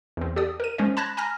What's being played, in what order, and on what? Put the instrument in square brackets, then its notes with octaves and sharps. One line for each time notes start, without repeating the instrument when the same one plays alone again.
[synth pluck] E2 C4
G4 A4 D5 D#6
A#4 D#7
G#3 C#4 C5 D#5
A5 B5 F#6 G#6 A#6
G#5 A#5 B5 F6 A#6